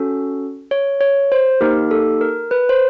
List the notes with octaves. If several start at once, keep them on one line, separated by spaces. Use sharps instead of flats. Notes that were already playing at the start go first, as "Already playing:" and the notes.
Already playing: C#4 F#4 A4
C#5
C#5
C5
A#3 D#4 G4 A#4
A4
A#4
B4
C5